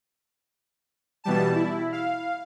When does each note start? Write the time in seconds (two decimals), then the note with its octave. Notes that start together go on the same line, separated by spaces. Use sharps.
1.24 B2 E3 G3 A5
1.55 E4
1.92 F5